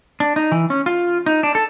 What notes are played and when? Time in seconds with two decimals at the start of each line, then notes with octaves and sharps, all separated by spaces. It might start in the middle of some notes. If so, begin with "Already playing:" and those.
0.20 D4
0.36 D#4
0.52 E3
0.70 C#4
0.86 F4
1.26 D#4
1.43 D4
1.55 A4